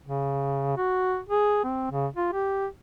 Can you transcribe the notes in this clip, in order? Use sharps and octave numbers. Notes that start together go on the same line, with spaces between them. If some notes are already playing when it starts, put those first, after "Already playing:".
C#3
F#4
G#4
C4
C#3
F4
G4